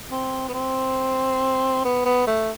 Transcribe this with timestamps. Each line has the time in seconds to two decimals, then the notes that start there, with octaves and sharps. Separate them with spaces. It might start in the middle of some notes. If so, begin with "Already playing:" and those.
0.11 C4
0.48 B3
0.54 C4
1.85 B3
2.05 B3
2.27 A3